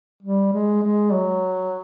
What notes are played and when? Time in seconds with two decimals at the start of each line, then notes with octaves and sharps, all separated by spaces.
0.23 G3
0.53 G#3
0.82 G#3
1.12 F#3